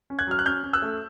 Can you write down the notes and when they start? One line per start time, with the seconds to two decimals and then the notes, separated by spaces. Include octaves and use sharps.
0.10 C#4
0.19 F#6 G#6
0.27 F#3 F6
0.39 F#6
0.46 C#4 F6 G6
0.63 C#4
0.73 E6 F#6
0.82 A3